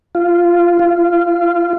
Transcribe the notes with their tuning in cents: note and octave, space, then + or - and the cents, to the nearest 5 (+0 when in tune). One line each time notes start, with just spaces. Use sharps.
F4 -10
F4 -25